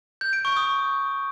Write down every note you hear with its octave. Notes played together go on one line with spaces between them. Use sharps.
G6
D7
C#6
D#6